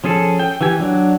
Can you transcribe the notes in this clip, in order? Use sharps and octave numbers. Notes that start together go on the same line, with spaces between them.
F3 C#4 G#4 A4
G5
E3 E4 G4 G#5
F#3 D4